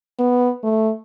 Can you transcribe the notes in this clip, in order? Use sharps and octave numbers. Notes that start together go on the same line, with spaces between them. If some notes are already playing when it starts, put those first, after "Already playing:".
B3
A3